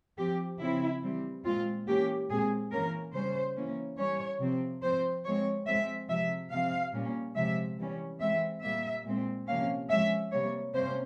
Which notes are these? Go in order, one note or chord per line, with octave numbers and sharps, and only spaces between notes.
F3 C4 G4
C#3 F3 C4 E4
E3 G3 C4
A#2 G#3 C4 F4
E3 A#3 C#4 G4
A#2 G#3 C4 G#4
E3 A#3 C#4 A#4
C#3 G3 C#4 C5
E3 A#3 C#4
E3 G3 C#4 C#5
C3 F3 C4
F3 C4 C5
F3 G#3 C4 C#5
F3 G#3 C4 E5
C3 F3 G#3 E5
C3 F3 C4 F5
A#2 G3 A#3 C#4
C3 F3 G#3 E5
E3 G3 C#4
E3 G#3 C4 E5
A#2 G3 A#3 E5
A#2 G#3 C4
C3 F3 A#3 C#4 F5
F3 G#3 C#4 E5
C3 G3 A#3 C#5
C3 G3 A#3 C#4 C5